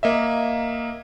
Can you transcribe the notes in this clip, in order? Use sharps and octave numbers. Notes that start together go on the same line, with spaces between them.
A#3 D#5 E5